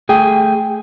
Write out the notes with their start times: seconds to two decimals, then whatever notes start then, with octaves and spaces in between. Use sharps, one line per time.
0.09 A3 G#4 G5